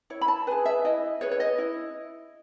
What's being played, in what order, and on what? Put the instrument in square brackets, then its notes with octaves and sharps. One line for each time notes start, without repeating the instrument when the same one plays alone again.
[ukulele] E4 C#5
B5
A5
G#4 B4 G#5
E5
E4 D#5
G#4 B4 C#5
C#5
D#5
E4